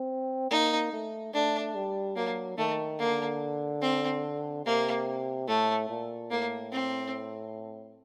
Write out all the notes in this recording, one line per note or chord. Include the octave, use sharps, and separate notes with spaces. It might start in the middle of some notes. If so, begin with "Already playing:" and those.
Already playing: C4
A#3 D#4
A3
A3 D4
G3
F#3 A#3
D#3 A3
D3 A#3
C4
C3 A#3
A2 A3
A#2
A2 A#3
C4